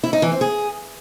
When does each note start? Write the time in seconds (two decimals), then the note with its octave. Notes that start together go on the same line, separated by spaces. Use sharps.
0.03 E4
0.13 D#4
0.22 E3
0.32 C4
0.41 G#4